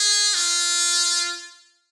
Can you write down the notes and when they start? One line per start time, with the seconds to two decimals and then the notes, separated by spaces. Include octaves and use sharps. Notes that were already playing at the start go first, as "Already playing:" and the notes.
Already playing: G#4
0.34 F4